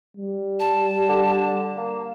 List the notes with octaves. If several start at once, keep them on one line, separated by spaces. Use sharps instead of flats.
G3
A5
D3
A#3